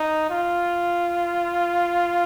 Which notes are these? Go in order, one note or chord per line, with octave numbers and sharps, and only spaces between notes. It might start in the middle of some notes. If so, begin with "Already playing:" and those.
Already playing: D#4
F4